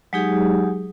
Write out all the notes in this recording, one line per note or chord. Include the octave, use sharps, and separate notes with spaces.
F#3 G#3 D#4 G4 G#4